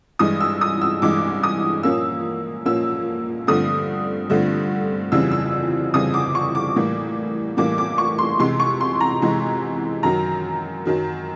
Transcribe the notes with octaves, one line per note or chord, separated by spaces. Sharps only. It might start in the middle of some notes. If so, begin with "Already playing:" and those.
G2 E3 G#3 D#6
E6
D#6
E6
G2 E3 G#3 D6
D#6
A#2 F3 A#3 C#4 E6
A#2 F3 A#3 C#4 E6
G2 D3 F3 A3 C4 D#6
G2 D3 F3 A3 C4
F2 C#3 E3 G3 C4 E6
E6
F2 C#3 E3 G3 C4 D#6
D6
C#6
D6
A2 E3 G3 A#3
A2 E3 G3 A#3 D6
D6
C#6
C6
C3 E3 G#3 C6
C#6
C6
A#5
C3 E3 G#3
F#2 D#3 F#3 A#5
F#2 D#3 F#3